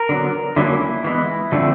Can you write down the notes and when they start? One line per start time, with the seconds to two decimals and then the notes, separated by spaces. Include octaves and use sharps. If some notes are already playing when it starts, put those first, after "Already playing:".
Already playing: A#4
0.09 D3 F#3 B3
0.56 D3 F#3 A#3 C#4 E4
1.04 E3 G#3 B3 E4
1.52 D3 F3 A3 C4